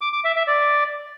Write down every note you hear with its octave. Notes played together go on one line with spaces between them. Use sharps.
D6
D6
E5
E5
D5